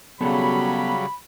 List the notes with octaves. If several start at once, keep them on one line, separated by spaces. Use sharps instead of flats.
C#3 F#3 G3 B3 F#4 A4 B5